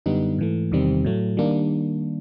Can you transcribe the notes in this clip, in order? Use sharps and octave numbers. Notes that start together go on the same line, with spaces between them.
F#2 D3 G3 B3 D#4
G#2 E3 A3
E2 C3 D#3 G3 C4
A2 F#3 A3
D#3 G3 A#3 D4